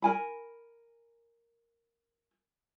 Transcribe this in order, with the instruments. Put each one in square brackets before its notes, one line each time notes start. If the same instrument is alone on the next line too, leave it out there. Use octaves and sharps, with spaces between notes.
[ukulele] A#4 G#5 B5